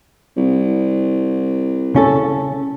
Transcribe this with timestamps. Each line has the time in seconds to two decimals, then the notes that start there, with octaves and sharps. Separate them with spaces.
0.37 C2
1.95 C#3 C#4 A4